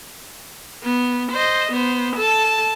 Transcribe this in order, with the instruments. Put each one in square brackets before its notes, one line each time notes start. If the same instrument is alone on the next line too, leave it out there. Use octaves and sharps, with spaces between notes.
[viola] B3
C5 D#5
B3 C5
A4 A5